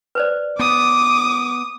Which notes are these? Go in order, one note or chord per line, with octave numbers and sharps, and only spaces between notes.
B4 C5 D5
B3 D6 D#6